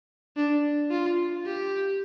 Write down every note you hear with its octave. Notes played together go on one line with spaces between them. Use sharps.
D4
F4
G4